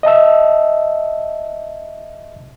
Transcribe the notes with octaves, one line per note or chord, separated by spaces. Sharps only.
D#5 E5 A5 E6